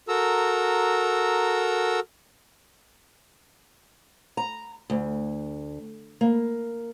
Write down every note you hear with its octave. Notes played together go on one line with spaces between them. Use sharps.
F#4 A4 A#4 A#5 E6
A#5
D2
A#3